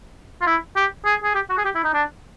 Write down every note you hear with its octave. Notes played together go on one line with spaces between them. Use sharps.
F4
E4
G4
G#4
G#4
G4
F#4
G#4
G4
E4
D#4
D4